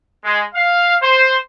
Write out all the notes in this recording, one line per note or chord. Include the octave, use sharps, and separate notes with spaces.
G#3
F5
C5